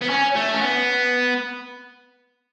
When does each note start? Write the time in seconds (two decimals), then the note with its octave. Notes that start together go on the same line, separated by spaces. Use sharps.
0.01 B3
0.09 C#4
0.35 A3
0.54 C#4
0.61 B3